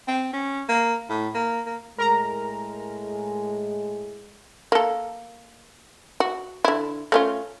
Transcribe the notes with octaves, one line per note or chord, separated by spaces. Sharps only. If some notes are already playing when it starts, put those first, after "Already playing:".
C4
C#4
A#3
A2
A#3
A#3
A2 G#3 A#4 A#5
A#3 A4
F#4
D3 E4
A3 C#4 F4